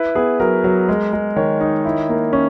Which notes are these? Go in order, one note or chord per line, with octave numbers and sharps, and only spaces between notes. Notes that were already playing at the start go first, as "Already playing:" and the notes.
Already playing: E4 B4
B3 G#4
F#3 A#4
F#3
G#3
G#3
D#3 C#5
D#4
E4
A#3
C#4